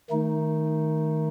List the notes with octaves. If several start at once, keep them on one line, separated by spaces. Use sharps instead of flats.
D#3 A3 D#4